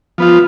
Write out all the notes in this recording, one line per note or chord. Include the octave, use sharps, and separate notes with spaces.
F3 B3 F4